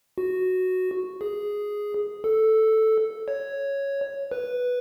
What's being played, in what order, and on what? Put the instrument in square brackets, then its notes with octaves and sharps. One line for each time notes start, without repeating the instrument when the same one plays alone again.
[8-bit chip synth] F#4
G#4
A4
C#5
B4